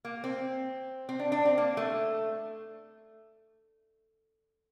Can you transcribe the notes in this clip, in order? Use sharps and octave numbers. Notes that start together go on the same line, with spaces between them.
A#3
C4
C4
D4
D4
C4
A#3
A3